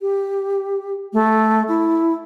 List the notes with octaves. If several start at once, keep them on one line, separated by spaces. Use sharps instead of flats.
G4
A3
E4